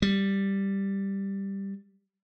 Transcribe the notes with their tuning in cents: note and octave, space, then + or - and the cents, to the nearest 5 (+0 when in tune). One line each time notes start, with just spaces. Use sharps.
G3 +0